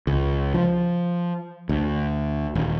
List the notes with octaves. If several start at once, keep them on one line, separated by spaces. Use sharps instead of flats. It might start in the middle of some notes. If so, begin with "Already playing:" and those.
C#2
F3
D2
D#1